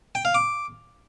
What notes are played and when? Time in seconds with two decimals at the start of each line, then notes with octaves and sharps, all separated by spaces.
0.15 G5
0.25 F5
0.35 D6